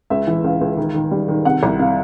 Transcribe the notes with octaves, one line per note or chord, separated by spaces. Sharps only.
C#2 E5
E3
C#2 F5
C#2
D#3
D#3
G3
D#3
C3 F#5
C2
C3 F5